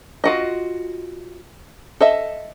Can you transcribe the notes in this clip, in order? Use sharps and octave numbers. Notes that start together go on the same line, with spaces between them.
F4 F#4 D#5
A4 D#5 E5